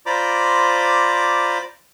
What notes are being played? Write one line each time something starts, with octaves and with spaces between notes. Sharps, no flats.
F4 C5 D5 A#5 B5 D6